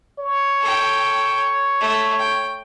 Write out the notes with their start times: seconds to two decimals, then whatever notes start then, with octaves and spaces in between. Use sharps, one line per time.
0.19 C#5
0.61 A4 G5
1.81 A3
2.19 G5